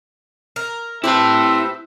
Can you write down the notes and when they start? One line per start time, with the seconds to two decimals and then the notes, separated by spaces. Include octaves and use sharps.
0.56 A#4
1.04 C4 E4 G4 B4 E5 A5